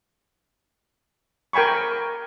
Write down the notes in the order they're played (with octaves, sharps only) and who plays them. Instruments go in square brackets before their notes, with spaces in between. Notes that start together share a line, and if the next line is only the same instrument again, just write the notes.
[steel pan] A#4 G5 G#5 B5 C#6